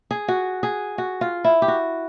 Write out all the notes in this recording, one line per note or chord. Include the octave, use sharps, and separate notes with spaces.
G#4
F#4
G#4
F#4
F4
E4
G4
F#4